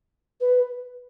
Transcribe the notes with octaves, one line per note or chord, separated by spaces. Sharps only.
B4